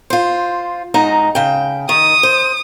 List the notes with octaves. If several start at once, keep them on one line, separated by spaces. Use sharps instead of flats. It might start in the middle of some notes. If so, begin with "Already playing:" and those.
F4 C5
G#2 D#4 A#5
C#3 G5
D#3 D#6
C5